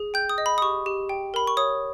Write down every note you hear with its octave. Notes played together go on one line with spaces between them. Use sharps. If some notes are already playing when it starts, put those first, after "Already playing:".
Already playing: G#4
G5 G6
D#6
D#5
B5
D#6
G4 C#6
G4
G5
A#4 B5
C#6
C#5 D#6